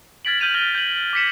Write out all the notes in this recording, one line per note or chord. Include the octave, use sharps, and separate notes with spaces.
F6 G#6 A6 B6 D7 F#7
F6 G6 G#6 D#7 F7 F#7
F6 G6 A#6 D#7 G7
G6 G#6 A#6 F#7
D6 A#6 B6 C#7 E7